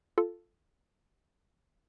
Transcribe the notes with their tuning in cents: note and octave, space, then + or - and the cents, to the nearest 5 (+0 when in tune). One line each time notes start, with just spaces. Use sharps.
F4 +0 A4 +0